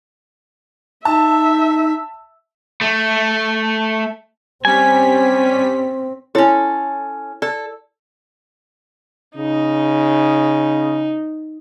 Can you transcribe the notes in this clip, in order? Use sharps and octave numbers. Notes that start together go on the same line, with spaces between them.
D#4 E5 A5
A3
G3 C4 C#4 G#5 B6
C#4 E4 A4 C#5 C6
A4 D5
C#3 D#4